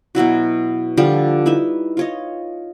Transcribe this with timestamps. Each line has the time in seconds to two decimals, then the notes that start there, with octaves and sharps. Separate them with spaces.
0.15 B2 F#3 E4 F#4
0.97 D3 F3 G3
1.46 D#4 E4 B4 E5
1.97 F4 C#5 D#5